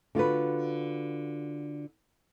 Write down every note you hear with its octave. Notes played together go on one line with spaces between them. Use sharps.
D3 F4 F#4 B4